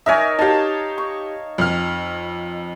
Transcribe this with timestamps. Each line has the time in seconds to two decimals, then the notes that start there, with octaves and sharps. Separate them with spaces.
0.06 D#4 A#4 C#5 E5 G#5
0.39 D#4 G4 F5 A5
0.98 C#6
1.58 F2 F6